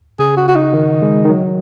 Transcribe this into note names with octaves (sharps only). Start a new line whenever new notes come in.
C#3 G#4
F#4
F#4
D#4
D#3
G#3
D#3
F#3